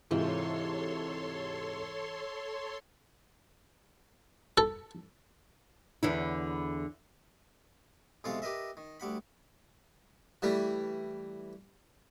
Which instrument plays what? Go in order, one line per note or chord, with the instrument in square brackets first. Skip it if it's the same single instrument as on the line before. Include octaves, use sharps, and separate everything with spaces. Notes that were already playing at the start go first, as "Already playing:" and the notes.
[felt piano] G#2 C3 [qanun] E3 F4 C5 [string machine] A4 C#5 C6
[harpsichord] A4
[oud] E2 D3 E4
[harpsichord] B1 C3 E3 G#3 A4 F5
G4 A#4 B4 D#5 E5
D#3
D2 G3 F#5 B5
E3 G3 A3